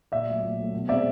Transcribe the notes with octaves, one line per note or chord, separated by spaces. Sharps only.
A#2 D5 E5
F#3 A3
A#2
F#3 A3
B2
G#3 C4 D5 E5